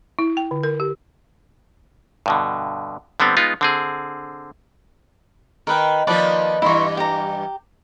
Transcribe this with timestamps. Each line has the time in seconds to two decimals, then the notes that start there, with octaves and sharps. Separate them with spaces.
0.19 E4
0.37 G5
0.51 D3
0.63 A#4
0.80 G4
2.26 G2 B2 D3
3.20 D3 G3 B3 C4
3.37 G#3 B3 D#4 F4
3.61 D3 C4 G#4
5.67 D#3 A#4 B4 G5
6.07 D#3 F3 A#3 B4 D5 A5
6.62 G2 E3 E4 C6 C#6
6.97 G4 A#5